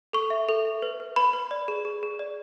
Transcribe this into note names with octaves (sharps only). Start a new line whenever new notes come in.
A4 C#6
E5
A4
E5
B4
B4
B4 B5
B4
D5
G#4
G#4
G#4
D5